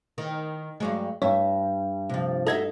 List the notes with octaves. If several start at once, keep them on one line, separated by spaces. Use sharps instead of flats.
D#3
G2 F#3 G#3
G2 C#5 E5
C3 F3
D#4 F#4 A4 E5 G#6